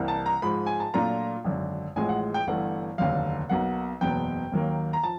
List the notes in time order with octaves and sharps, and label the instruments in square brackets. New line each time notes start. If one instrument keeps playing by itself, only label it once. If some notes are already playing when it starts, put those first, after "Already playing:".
Already playing: [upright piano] C2 C3 E3 G3 A#3
A5
A#5
G#2 F3 G#3 B5
G#5
A5
A#2 F#3 A3 D4 F4 A#5
G#1 F#2 D3
A1 A2 F3 G#3 G#5
F#5
G5
G1 G2 E3 A3 F#5
F1 D#2 D3 F#3 F5
B1 B2 F#3 A#3 F#5
F#1 E2 B2 F#3 B3 G5
D#2 D#3 F#3 A#3
A#5
F3 A5